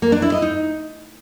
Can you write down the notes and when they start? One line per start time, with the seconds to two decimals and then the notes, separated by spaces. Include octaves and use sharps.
0.02 A#3
0.12 D4
0.22 E4
0.32 D#5
0.42 D#4